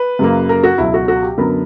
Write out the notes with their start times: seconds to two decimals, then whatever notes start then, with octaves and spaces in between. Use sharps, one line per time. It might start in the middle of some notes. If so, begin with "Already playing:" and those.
Already playing: B4
0.19 F#2 C#3 F#3 A#3
0.49 A#4
0.64 F#4
0.78 C#2 B2 F#3 E4
0.94 F#4
1.08 F#4
1.23 G4
1.37 F#2 D3 F#3 B3 A#4